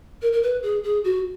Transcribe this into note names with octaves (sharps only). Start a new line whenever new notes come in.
A#4
A#4
B4
G#4
G#4
F#4